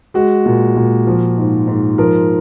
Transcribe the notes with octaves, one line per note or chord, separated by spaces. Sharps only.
G#3 F#4
A#2
A#2
F3
G#2
G#2
F3 A#4